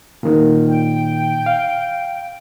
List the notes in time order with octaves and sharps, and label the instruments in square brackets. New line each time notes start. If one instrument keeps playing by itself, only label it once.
[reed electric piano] A#2 D#3
[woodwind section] G5
[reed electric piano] F5